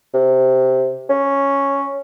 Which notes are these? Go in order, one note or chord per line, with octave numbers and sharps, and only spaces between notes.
C3
C#4